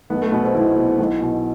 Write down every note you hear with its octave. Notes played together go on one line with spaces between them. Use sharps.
B1 B3
A3
B2 B3
C4
B1 E4
B2
B1
B2